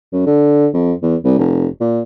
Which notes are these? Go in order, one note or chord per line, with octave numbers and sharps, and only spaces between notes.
F#2
D3
F2
E2
C2
F1
A#2